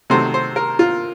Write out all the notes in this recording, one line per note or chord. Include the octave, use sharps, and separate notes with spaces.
C3 D#3 F#3 A3 C5
C5
A#4
F4